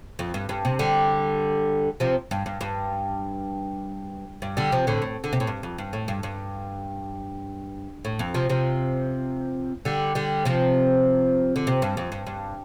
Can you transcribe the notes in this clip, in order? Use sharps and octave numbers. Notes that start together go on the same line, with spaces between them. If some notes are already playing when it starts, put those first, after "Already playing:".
F2
G2
G2
C3
D3 G3
C3 F3
G2
G2
G2
G2
D3 G3
C3 F3
A2 D3
A2
D3
C3
A2
G2
F2
G2
A2
G2
G2
A2
F2
C3 F3
C3 F3
D3 G3
D3 G3
C3 F3
D3
C3
G2
F2
G2
G2